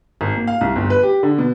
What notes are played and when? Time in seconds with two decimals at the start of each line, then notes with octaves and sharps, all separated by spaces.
0.21 G#1
0.36 A#3
0.48 F5
0.61 C2
0.76 G1
0.90 B4
1.03 G4
1.23 D3
1.38 B2